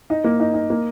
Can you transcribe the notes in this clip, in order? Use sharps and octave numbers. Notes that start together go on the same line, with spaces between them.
D#4
A#3
D#4
D#4
A#3